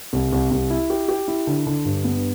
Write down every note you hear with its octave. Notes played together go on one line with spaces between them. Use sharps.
C2
C2
C2
E4
G4
G4
E4
D3
D3
G2
B3